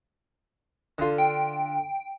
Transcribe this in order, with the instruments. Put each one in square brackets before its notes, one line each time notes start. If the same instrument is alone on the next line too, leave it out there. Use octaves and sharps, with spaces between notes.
[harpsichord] D3 F4
[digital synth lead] G5